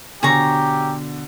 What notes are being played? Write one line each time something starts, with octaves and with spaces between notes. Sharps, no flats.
B2 D3 D4 G4 G#4 C#5 A#5